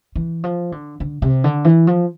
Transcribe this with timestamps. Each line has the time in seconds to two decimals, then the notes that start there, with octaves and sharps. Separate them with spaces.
0.16 E3
0.44 F3
0.72 D3
1.00 D3
1.22 C3
1.44 D3
1.65 E3
1.87 F3